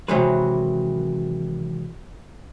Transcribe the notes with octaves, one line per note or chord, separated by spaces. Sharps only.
C3 D#3 E3 F#3 G#3 B4